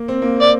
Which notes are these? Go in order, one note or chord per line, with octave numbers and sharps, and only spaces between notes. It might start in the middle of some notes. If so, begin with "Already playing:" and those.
Already playing: A#3
C4
A#3
C4
D5